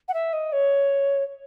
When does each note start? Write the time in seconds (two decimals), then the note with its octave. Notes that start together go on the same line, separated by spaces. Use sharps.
0.08 F#5
0.14 E5
0.33 D#5
0.52 C#5